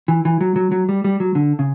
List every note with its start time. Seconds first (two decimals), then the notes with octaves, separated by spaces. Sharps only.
0.08 E3
0.25 E3
0.41 F#3
0.56 F#3
0.72 F#3
0.89 G3
1.04 G3
1.20 F#3
1.35 D3
1.59 C#3